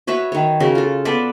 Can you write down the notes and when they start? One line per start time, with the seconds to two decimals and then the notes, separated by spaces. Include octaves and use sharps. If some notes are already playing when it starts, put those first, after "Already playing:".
0.07 F#4 B4 C#5 E5
0.32 D#3 C#5
0.60 C#3 F#4 A#4
0.75 F4 A4
1.05 B3 A4 B4 D5